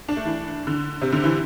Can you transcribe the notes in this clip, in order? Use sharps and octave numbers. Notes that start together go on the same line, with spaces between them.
D4
A3
E3
D3
C3
D3
E3